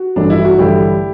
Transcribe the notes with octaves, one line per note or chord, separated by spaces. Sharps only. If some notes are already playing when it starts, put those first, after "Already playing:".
Already playing: F#4
A1 G2 F#3 A3 D4
E4
F#4
A1 G2 D3 A3 E4 G4